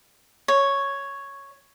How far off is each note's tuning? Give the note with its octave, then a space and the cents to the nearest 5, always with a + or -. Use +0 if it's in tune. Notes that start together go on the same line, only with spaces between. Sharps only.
C#5 +0